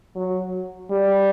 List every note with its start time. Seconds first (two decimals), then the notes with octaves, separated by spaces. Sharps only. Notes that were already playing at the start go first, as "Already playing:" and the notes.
0.16 F#3
0.91 G3